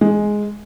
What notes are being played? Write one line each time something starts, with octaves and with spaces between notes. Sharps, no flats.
G#3